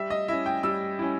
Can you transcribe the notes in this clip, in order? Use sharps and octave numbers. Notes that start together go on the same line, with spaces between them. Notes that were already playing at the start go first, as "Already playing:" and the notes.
Already playing: G3 E5
D#5
C#4 E4 E5
G5
G3 E6
C#4 E4